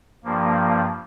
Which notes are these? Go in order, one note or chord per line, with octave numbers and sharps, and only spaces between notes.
G2 F3 A#3